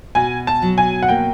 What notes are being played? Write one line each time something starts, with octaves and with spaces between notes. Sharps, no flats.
B2 G#5
A5
F#3
G#5
F#5
A#3 G5